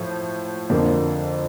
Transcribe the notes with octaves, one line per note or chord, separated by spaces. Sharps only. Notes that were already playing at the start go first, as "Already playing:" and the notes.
Already playing: A2 F3
F2 D3 F3 A#3